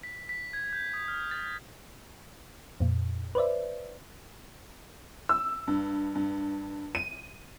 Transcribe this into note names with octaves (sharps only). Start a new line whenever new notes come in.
B6
B6
G#6
G6
D#6
F6
A6
F2 A#2
B4 C5 D5 E5
E6
G2
G2
D#7